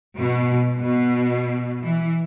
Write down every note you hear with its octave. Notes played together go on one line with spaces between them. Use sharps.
B2
B2
E3